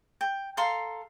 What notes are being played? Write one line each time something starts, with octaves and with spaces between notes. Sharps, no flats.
G5
A4 F5 A#5 C6